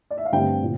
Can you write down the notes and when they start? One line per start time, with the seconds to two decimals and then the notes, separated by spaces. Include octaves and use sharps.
0.10 D5
0.18 E5
0.25 F5
0.32 G2 D3 A3 C4 G5
0.63 A#2